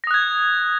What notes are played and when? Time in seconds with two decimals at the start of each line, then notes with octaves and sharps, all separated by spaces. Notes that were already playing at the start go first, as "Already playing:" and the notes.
0.04 A#6
0.07 D#6
0.11 F#6
0.14 G#6